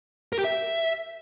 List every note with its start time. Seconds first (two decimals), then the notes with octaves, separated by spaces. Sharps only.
0.33 A#4
0.39 G4
0.44 E5